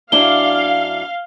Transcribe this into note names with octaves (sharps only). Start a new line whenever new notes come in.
F#2 D4 E4 F5 G7